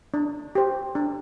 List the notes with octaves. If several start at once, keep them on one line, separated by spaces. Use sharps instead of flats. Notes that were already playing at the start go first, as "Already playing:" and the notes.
D4
G4 C5
D4